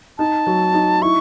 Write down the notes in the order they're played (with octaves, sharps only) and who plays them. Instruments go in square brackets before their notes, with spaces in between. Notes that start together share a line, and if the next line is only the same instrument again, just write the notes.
[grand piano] D#4 [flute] A5
[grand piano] F#3
D#4
[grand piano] E4 [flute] C#6